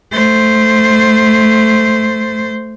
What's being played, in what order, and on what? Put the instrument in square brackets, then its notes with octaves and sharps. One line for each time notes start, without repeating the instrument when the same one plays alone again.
[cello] A3 C5